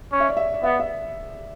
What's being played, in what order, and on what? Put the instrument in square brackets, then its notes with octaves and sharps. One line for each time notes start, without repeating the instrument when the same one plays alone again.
[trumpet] C#4
[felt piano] E5
D5
E5
D5
[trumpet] B3 [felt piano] E5
[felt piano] E5